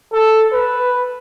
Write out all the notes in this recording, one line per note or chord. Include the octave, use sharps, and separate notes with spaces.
A4
B4